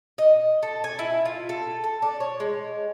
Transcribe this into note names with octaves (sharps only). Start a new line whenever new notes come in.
D#5
A4
G#5
E4
F4
A4
A4
D4
C#5
G#3